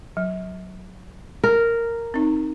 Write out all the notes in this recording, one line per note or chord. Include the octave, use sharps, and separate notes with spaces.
F#3
A#4
C4 D#4